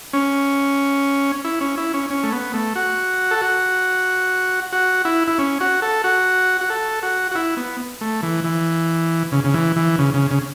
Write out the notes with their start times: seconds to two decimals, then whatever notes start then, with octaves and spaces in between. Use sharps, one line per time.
0.13 C#4
1.44 E4
1.61 C#4
1.77 E4
1.94 C#4
2.10 C#4
2.23 A3
2.32 B3
2.54 A3
2.76 F#4
3.31 A4
3.42 F#4
4.72 F#4
5.05 E4
5.28 E4
5.39 C#4
5.60 F#4
5.82 A4
6.04 F#4
6.61 F#4
6.70 A4
7.03 F#4
7.31 F#4
7.35 E4
7.57 B3
8.01 A3
8.23 E3
8.44 E3
9.32 C#3
9.44 C#3
9.54 E3
9.76 E3
9.98 C#3
10.14 C#3
10.31 C#3